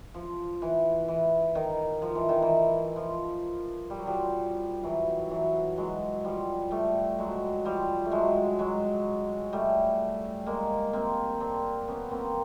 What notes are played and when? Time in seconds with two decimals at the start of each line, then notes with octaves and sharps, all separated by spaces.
0.14 F3
0.62 E3
1.08 E3
1.55 D#3
2.02 F3
2.15 E3
2.29 D#3
2.42 E3
2.96 F3
3.90 G3
3.98 F#3
4.07 F3 G3
4.83 E3 F#3
5.30 E3 F#3
5.77 F#3 G#3
6.25 F3 G3
6.71 G3 A3
7.19 F#3 G#3
7.65 F3 G3
8.06 A3
8.12 F#3 G#3
8.59 F#3 G#3
9.53 G3 A3
10.46 G#3 A#3
10.93 A#3 C4
11.40 C4 D4
11.87 B3 C#4
12.11 A#3 C4